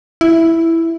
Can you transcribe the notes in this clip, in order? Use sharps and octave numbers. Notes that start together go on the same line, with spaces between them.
E4